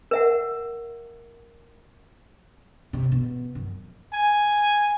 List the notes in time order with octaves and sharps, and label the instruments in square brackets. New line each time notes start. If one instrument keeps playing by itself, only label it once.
[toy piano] A#4 E5 F#5
[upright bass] C3
B2
F#2
[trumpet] G#5